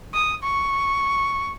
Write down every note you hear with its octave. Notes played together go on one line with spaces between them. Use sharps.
D#6
C#6